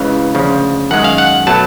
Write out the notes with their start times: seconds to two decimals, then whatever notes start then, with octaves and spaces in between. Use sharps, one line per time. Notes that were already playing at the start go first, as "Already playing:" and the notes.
Already playing: C#2 C#3 E3 F5
0.35 D2 C#3 F3
0.91 F#2 D#3 G#3 F#5
1.04 F5
1.18 F#5
1.47 B2 F#3 A3 A5